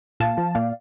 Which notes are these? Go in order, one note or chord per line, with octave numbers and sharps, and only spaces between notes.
A#2 F5 A5
F3
A#2 D5 F5